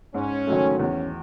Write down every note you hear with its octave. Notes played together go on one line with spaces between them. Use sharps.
G#2 C#4
D#3 F#3 A3
E2 C#4